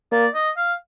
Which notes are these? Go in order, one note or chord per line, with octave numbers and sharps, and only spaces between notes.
A#3 D5
D#5
F5